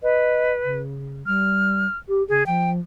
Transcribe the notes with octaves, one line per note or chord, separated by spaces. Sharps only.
B4 D#5
C#3
G3 F6
G4
C#3 G#4
F3 G5